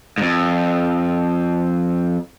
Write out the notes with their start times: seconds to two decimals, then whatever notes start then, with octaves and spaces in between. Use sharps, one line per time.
0.18 F2 G#2